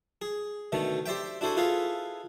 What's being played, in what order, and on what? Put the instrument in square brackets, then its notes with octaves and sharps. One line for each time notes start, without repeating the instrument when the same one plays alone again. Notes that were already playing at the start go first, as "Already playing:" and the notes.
[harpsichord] G#4
B2 D3 D#3 A3
G4 C5 D5 E5 G5
D4 E4 F#4 A4 C5 G#5
E4 F4 G#4 A4 B4 F5